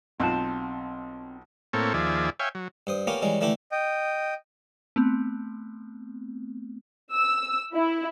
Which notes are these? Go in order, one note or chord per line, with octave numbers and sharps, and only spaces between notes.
B1 C4 F4 A5 F#6
A2 A#3 C4 A4 C#5
D#2 F3 G#4 D5 E5
C#5 E5 F5 G5 G#5
F#3
G2 C5 D#6
A#3 B3 C#4 F4 G4
E3 G3 G#3 C#4
D3 E3 A3 E4 G4
D#5 G5
A3 B3 C4
E6
E4